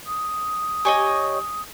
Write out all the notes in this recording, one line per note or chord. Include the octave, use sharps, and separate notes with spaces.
D#6
G4 C#5 D#5 G#5